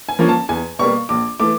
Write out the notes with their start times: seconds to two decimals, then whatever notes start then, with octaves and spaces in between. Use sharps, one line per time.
0.09 G#5
0.19 F3 A#3 C#4
0.29 A5
0.49 E2 G#5
0.79 B2 G3 A#3 C#6
1.09 A#1 D6
1.40 E3 A3 D6